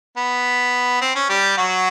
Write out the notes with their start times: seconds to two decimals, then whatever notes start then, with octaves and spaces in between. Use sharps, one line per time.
0.17 B3
1.01 C4
1.15 C#4
1.29 G3 G4
1.58 F#3 F#4